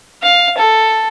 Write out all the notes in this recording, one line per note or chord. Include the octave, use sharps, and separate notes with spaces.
F5
A4